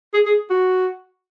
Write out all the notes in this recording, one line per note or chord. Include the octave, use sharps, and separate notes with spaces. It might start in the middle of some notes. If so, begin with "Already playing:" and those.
G#4
G#4
F#4